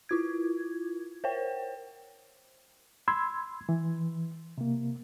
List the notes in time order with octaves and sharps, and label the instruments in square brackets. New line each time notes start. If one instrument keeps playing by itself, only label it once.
[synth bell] E4 F4 G#6
A#4 C5 C#5 G5
[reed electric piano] B5 C6 E6 G#6
E3
C3 A#3